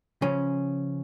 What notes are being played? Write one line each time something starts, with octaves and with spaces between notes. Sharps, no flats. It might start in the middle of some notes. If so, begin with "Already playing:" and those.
C#3 F3 C#4